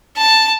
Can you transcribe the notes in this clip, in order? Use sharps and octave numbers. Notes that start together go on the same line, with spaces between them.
A5